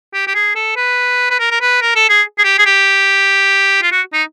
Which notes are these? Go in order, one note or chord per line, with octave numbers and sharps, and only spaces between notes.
G4
G4
G#4
A4
B4
B4
A#4
A#4
B4
A#4
A4
G#4
G#4
G4
G#4
G4
F4
F#4
D#4